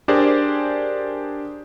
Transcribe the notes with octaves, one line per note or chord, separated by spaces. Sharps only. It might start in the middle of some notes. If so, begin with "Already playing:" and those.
D4 G4 G#4 A#4 C5 D5